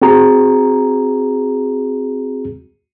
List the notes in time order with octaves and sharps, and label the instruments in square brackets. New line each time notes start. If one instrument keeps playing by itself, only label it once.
[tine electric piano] C4 F#4 G#4 A#5